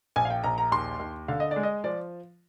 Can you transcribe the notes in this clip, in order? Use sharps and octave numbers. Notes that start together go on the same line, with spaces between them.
A#1 G#5
F5
G5
A#1 A#5
A#5
D#2 C6
D#2
D3 F5
D#5
D5
G#3
D#5
F3 D5